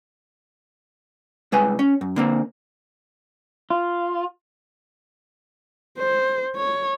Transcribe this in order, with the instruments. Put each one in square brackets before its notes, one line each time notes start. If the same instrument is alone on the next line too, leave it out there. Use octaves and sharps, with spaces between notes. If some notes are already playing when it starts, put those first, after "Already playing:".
[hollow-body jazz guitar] C2 G#3 B4 G#5
C#4
F#2
D3 A#3 C4
[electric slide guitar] F4
[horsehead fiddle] C5
C#5